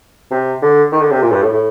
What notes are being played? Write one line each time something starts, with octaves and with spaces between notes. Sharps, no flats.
C3
D3
D#3
D3
C3
A#2
G2
A2
A2